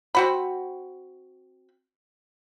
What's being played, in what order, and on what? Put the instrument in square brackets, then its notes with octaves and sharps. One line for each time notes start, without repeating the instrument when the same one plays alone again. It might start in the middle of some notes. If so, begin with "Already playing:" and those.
[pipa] C4 F#4 B5